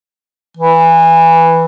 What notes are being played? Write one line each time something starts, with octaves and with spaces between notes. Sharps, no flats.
E3